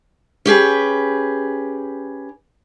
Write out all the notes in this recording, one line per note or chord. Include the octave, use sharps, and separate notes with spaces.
C#4 G4 G#4 B4